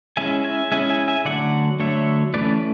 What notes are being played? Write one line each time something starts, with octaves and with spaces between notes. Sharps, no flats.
G#3 C#4 E4 E5 G#5
E5 G#5
G#3 C#4 E4 E5 G#5
E5 G#5
E5 G#5
D3 F#3 A3 D5 F#5
D3 F#3 A3 C#5 E5
E3 A3 C#4 B4 D5